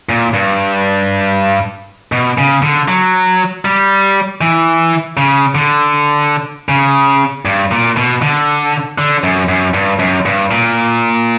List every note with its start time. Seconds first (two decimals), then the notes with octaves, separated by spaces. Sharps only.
0.09 A#2
0.34 G2
2.12 B2
2.38 C#3
2.62 D3
2.88 F#3
3.65 G3
4.41 E3
5.17 C#3
5.55 D3
6.69 C#3
7.45 G2
7.72 A#2
7.97 B2
8.22 D3
8.98 D3
9.23 F#2
9.49 F#2
9.74 G2
9.99 F#2
10.25 G2
10.51 A#2